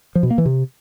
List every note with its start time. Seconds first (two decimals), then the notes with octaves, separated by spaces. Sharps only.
0.15 F3
0.23 B2
0.30 A#3
0.38 E3
0.46 C3